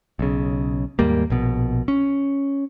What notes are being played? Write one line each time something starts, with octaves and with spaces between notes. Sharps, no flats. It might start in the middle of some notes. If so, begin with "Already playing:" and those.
B1 C#3
D#2 G#2 G3 A#3
A#1 B2
C#4